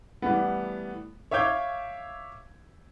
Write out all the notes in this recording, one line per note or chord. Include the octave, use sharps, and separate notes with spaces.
E3 G3 A3 B3
C#5 E5 F5 D6 G6 G#6